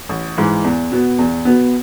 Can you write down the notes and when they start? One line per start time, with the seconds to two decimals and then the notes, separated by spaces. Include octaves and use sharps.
0.09 A1
0.37 G#2 E3
0.64 E2
0.92 B2 B3
1.18 E2
1.45 B2 B3